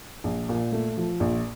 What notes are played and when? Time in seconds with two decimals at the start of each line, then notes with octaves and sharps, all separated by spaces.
0.24 A#1
0.49 A#2
0.72 A3
0.96 F3
1.20 A#1